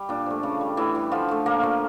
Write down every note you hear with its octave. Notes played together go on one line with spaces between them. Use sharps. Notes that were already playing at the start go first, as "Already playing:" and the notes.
Already playing: G3
A#2 D4
F3 A3
C#3
G3
A2 E3 E4
E3 G3
D3 F3 F4
F3 A3
A#2 A#3 A#4
F3 A3